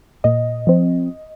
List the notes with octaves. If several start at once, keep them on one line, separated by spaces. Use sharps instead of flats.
A#2 D#5
F3 C4